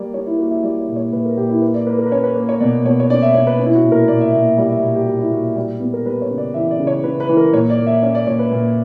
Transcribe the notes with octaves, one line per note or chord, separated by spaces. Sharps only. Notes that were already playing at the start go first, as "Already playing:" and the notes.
Already playing: G3 A#3 D5
G3 C#5
E4
A#3 F#4
E5
G3 D5
C#5
A#2
C#5
A#2 B4
A#4
A#2 G4
E4
A#3 B4
D5
A#3 B4
A#4
B4
C#4 C#5
B4
A#3 B4
C#5
B2 D5
B2 C#5
C#5
C#4 D5
E5
B2 C#5
B4
C#4
E4
F#4
A#2
A#4
A#2 D5
E5
A#2 E5
E5
G3 D5
E5
A#2
G4
G3 F#4
E4
A#2 F#4
E5
G3 D5
B3
A#4
G3 B4
C#5
C#3
D5
E3 E5
D5
C#3
C#5
C#3 B4
B4
E3
A#4
A#2 C#5
D5
A#3
E5
C#4 D5
D5
A#2 C#5
B4
A#2